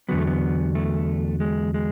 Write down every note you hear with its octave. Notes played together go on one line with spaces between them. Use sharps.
E2 D3 F#3 B3
A3
B3
A3
G#3
G#3